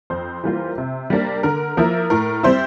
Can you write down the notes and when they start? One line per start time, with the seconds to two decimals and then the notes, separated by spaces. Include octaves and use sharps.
0.10 F2 C5
0.44 E3 G3 A#3 F4
0.78 C3
1.10 G3 A#3 D4
1.43 D3 A#4
1.77 F3 A#3 E4 A#4
2.10 A2 A#4
2.43 G3 C4 E4 C5